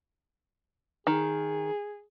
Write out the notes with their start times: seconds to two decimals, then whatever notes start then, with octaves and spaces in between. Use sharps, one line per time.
1.07 D#3 G#4